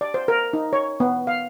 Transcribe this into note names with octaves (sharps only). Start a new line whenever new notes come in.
D5
C5
A#4
D#4
C#5
B3
F5